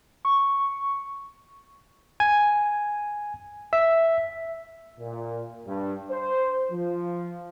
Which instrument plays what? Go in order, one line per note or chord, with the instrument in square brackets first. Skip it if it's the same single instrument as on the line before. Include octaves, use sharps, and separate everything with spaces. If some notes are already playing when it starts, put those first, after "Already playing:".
[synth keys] C#6
[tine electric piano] G#5
E5
[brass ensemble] A#2
G2
C5
F3